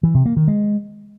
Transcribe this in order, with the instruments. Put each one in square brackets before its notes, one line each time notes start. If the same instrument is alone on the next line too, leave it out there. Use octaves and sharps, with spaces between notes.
[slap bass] E3
C3
A#3
D#3
G#3